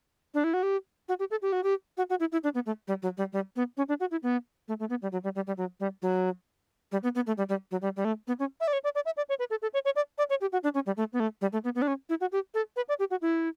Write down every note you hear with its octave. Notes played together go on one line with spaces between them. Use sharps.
D4
E4
F#4
G4
F#4
G4
A4
G4
F#4
G4
F#4
F#4
E4
E4
D4
B3
A3
G3
F#3
G3
G3
B3
C#4
D4
F#4
E4
B3
A3
A3
B3
G3
F#3
G3
G3
G3
F#3
G3
F#3
G3
B3
B3
A3
G3
G3
F#3
G3
G3
A3
B3
C#4
E5
D5
C#5
D5
D5
E5
D5
C#5
B4
A4
A4
C#5
C#5
D5
D5
C#5
G4
F#4
D4
C#4
G3
A3
B3
A3
G3
A3
B3
B3
D4
C#4
E4
F#4
G4
A4
B4
D5
G4
F#4
E4